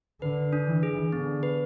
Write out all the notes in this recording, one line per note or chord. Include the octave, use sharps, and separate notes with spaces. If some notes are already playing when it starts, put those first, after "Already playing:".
D3 B4
D4
E3
G#4
D3 B3
B4